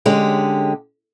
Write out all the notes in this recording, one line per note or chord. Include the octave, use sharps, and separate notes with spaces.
D3 G#3 C#4 G4